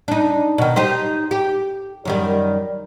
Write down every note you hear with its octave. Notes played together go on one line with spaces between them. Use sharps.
D4 D#4
B2 D#3
D#4 G4 C5
G4
F#2 D#3 G3